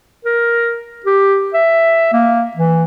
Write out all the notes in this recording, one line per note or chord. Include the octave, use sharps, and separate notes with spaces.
A#4
G4
E5
A#3
E3